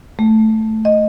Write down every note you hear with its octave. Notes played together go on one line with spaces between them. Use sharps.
A3
D#5